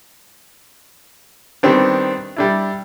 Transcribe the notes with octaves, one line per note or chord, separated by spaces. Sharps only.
D#3 G3 B3 C4 D4
G3 D4 E4